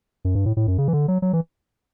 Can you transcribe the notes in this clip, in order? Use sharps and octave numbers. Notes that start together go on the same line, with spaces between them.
F#2
G2
A2
A2
F#2
C#3
E3
D3
F#3
F#3
E3